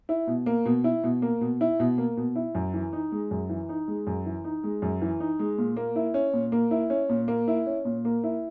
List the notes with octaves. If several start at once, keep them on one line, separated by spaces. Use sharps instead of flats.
E4
B2
A#3
B2
E4
B2
A#3
B2
E4
B2
A#3
B2
E4
F#2
E3
D#4
G#3
F#2
E3
D#4
G#3
F#2
E3
D#4
G#3
F#2
E3
D#4
G#3
A#2
A#3
E4
C#4
A#2
A#3
E4
C#4
A#2
A#3
E4
C#4
A#2
A#3
E4